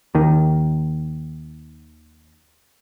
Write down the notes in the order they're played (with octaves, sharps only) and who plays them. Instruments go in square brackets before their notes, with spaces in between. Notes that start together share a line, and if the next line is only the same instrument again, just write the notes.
[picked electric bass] D#2 D#3